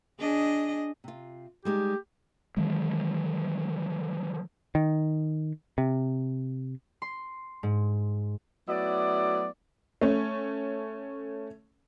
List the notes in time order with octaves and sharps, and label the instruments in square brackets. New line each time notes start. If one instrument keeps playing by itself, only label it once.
[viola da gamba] D4 G#4 D#5
[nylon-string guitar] C3 F4
[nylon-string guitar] G3 G#3 D#4 [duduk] G4
[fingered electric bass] D#3 E3 F#3 G#3
[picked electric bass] D#3
C3
[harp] C6
G#2
[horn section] F#3 A3 B3 E4 D5
[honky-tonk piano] A3 C#4